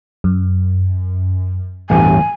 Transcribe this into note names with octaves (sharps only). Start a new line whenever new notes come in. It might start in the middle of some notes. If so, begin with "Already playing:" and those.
F#2
A1 E2 G2 G#5